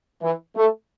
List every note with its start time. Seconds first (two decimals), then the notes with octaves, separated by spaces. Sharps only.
0.22 E3
0.56 A3